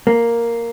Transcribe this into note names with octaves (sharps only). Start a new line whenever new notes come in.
A#3